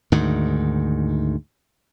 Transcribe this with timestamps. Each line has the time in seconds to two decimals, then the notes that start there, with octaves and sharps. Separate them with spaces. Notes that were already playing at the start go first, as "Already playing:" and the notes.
0.12 D2 G#2 D#3